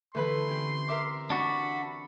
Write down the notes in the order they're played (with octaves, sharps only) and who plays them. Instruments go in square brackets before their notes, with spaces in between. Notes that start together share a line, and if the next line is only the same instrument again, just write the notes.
[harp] D3 E3 [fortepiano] A3 B4 B5 [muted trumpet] C6
[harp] C4 C#4 G4
[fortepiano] A#4 E5 D6
[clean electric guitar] D4 F#4 [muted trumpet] B5